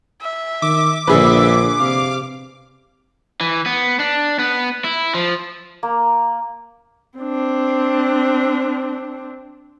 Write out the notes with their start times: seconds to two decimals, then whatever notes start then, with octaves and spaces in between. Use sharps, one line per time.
0.22 E5
0.62 D#3 D6
1.07 A#1 D3 G#4 B4 E5
1.80 C3 F5
3.41 E3
3.66 B3
4.00 D4
4.39 B3
4.84 E4
5.14 F3
5.83 A#3
7.18 C4 D4